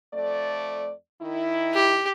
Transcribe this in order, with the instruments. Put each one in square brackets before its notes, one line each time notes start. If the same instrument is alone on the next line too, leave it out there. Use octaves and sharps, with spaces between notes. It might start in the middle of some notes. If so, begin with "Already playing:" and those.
[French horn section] F2 A3 D5
D#3 E4
[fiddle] G4